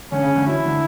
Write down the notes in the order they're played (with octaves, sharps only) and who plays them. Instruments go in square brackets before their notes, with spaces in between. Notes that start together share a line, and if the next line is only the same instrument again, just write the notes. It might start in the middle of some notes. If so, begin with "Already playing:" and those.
[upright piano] D3 [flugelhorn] C#4
[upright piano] C#3
D3
[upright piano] F#3 [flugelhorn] E4
[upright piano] E3
D3